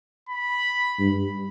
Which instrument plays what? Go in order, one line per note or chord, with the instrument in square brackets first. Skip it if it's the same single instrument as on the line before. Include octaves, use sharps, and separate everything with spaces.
[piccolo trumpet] B5
[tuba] G2